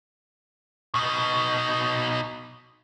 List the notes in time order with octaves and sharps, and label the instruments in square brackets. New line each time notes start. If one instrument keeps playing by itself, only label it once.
[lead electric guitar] B2 D#4